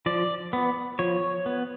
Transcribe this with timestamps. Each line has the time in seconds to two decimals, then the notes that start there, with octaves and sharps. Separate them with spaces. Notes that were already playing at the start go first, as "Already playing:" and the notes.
0.06 F3 D5
0.53 B3
0.99 F3 C#5
1.46 B3